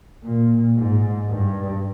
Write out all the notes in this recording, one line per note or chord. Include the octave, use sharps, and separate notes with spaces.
A#2
G#2
G2